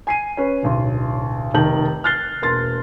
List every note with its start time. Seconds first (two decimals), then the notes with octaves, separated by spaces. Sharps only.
0.07 G#5 C7 D#7
0.37 C#4 B4
0.63 D1 B1 C6
1.54 F1 D#3 A5 G6 F#7
2.04 F6 F#6 A6 C7 G7
2.42 E1 A#3 C6 A6